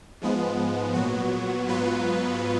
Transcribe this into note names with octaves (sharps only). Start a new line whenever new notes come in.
G#2 F3 G#3 B3
A#2 F#3 B3 F#4
G#2 F#3 B3 F4 B4